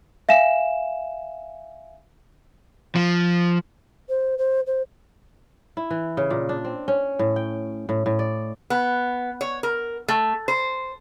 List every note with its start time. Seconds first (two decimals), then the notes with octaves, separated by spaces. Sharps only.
0.29 E5 F5 G#5 E7
2.96 F3
4.09 C5
4.38 C5
4.66 C5
5.77 E4
5.90 E3
6.17 C#3
6.30 A#2
6.49 D4
6.64 C4
6.88 C#4
7.19 A2
7.36 G5
7.89 A2
8.06 A2
8.19 D5
8.70 B3
9.41 C#5
9.63 A#4
10.08 A3
10.48 C5